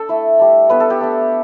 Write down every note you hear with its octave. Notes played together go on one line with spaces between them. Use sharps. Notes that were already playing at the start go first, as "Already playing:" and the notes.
Already playing: D4 A4
A3 E4
G3 D4
A3 B3 E4 B4
A4
G4
A3 D4